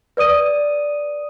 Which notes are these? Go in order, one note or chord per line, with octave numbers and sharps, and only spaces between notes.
B4 D5 D#6 D#7